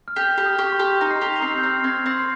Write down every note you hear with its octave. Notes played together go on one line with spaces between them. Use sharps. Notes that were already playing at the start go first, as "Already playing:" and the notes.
F6
G4 G6
F6
G4
D#6
G4 C#6
C6
G4
C#6
D#4 A#6
C7
G4 F7
F7
C4 C7
G6
C4 F6
C4 G#6
C4